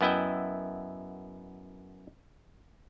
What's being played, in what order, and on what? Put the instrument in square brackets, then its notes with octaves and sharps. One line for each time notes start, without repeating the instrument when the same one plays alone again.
[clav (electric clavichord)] F#2 B3 E4 D#5 E5 G5